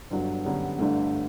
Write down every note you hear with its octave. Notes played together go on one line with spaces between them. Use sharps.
G1 G2 F#3
F#2 D3 G3 B3
G1 G2 D3 A3